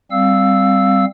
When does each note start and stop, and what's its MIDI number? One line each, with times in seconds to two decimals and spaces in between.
0.11 1.05 55
0.11 1.05 60
0.11 1.05 77
0.11 1.05 88